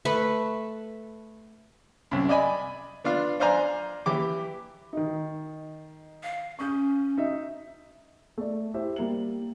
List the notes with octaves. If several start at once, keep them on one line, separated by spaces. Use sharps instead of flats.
A3 B4 B5
C2 F#2
D5 D#5 G#5 B5
B3 D4 F4 F5
D4 C5 D5 F5 G#5 A#5
E3 G4 D6
D#3 D#4
F5
C#4 C#6 D#6 G6
D#4 E5
A3 D5
E4 G4 C5 E5
G3 A#3 F#7